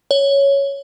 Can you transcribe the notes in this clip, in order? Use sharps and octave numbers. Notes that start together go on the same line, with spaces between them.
C#5